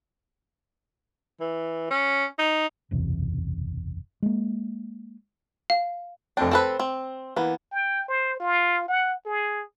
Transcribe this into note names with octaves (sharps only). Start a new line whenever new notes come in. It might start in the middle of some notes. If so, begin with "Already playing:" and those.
E3
C#4
D#4
F#1 B1 E2 C3
G#3 A#3
F5
F1 C4 D4 G5
C4 A4 B4 C5
C4
E3 A#3 B3
G5
C5
F4
F#5
G#4